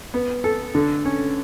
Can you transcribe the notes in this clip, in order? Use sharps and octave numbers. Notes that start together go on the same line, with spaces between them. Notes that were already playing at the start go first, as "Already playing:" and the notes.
B3
A4
D3
C#4